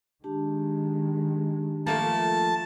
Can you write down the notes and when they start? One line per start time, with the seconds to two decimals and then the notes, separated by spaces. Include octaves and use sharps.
0.24 D#3 G#3 D4 G4 A5
1.87 F3 A3 A#3 A5